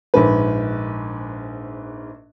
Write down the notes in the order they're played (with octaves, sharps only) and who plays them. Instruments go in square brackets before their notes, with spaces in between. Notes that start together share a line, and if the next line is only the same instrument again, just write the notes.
[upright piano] A#1 G#2 B4